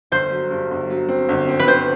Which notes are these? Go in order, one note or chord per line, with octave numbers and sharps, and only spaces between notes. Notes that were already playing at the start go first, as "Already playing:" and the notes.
G1 C5
F#3
G2
G1
F#3
C4
G1
C4
B4
C4 C5